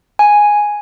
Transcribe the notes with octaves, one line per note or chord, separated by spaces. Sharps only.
G#5